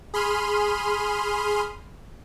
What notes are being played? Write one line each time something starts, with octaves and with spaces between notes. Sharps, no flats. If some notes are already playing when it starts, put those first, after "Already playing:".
G#4 B5 C6 F6 D#7